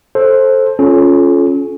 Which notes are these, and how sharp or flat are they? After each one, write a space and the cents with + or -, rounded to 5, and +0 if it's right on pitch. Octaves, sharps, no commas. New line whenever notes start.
A4 +0 C5 +15
C#4 +0 F4 +0 A4 -40